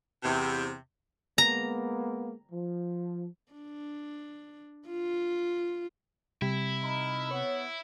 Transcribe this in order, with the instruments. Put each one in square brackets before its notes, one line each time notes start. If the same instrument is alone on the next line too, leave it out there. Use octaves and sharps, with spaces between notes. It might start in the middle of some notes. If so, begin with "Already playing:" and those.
[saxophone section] E2 C3
[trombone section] G#3 A#3 B3 [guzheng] A#5
[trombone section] F3
[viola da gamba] D4
F4
[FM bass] C3 [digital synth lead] G3 [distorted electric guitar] E4
[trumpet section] D#4 A#4 B5
[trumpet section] B3 [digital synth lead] C#5